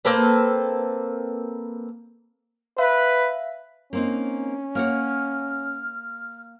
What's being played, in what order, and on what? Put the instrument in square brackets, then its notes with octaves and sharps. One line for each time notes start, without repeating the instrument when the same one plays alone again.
[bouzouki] A#3 C4 A4 B4
[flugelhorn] B4 [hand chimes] E5 F5
[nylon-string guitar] A#3 C4 D#4 [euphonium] C#4
[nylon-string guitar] A#3 C#5 F#5 [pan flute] F6